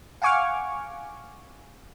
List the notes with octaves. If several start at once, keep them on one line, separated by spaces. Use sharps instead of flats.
F5 F#5 G#5 C#6 D6 F6